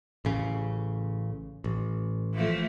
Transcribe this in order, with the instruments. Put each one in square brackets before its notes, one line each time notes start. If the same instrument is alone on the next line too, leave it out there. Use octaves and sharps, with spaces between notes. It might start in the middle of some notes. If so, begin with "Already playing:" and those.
[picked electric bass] A1 C#3
A1
[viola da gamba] E3 F3 A3